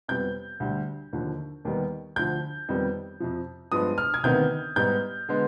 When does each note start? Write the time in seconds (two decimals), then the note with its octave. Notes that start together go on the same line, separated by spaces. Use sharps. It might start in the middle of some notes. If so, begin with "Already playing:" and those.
0.08 F2 C3 G3 B3 G6
0.60 D2 D3 G3
1.13 D#2 D3 F3
1.65 D#2 D#3 G3 B3
2.16 D2 D3 F3 G6
2.69 F2 D#3 G3 B3
3.20 F2 C3 F3
3.72 G2 F3 G#3 B3 D#6
3.98 F6
4.14 G#6
4.23 D2 C3 D#3 B3 G6
4.76 G#2 G3 B3 G6
5.29 D3 G#3 B3